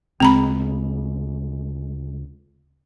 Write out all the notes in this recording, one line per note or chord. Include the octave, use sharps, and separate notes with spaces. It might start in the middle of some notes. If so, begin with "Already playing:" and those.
D2 C#3 G#3 C4 A#5 B5